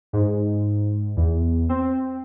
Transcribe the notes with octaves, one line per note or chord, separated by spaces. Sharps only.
G#2
E2
C4